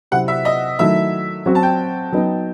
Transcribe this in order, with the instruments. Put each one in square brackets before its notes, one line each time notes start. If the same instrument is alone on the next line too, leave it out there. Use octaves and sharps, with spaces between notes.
[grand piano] C3 F#3 C4 E4 G4 [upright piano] F#5
[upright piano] E5
D#5
[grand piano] D#3 F#3 A3 E4 [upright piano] E5
[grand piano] F#3 C4 F#4
[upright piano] A5
G5
[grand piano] F#3 B3 D#4